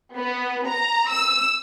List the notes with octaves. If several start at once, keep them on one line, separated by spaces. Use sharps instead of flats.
B3
A#5
E6